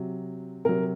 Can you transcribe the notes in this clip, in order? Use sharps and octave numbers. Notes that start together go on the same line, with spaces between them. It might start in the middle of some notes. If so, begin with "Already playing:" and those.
Already playing: C3 F#3
C3 F#3 A#4